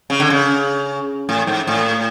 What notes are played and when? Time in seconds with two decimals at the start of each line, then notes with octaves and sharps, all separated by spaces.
0.10 C#3
0.20 D3
0.30 C#3
1.29 A2
1.47 G#2
1.67 A2